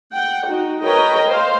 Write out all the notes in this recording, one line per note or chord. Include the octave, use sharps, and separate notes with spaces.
F#5 G5
D#4 F#4
A#4 B4 C#5 D#5 G5 A#5
C5 F5